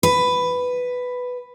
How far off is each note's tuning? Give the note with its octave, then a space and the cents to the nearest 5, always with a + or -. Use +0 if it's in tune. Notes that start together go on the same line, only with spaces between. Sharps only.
B4 +5